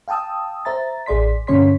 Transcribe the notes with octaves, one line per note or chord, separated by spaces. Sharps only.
F5 G5 A5 D#6 E6
C5 E5 A#5 A6
A1 G#4 D5 C6 B6
G2 D3 C#4 C#5 C6 B6